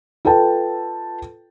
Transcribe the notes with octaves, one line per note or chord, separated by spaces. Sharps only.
F4 A4 B4 G5 A5